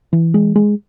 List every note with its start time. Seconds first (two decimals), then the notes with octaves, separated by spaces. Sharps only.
0.13 E3
0.34 G#3
0.56 G#3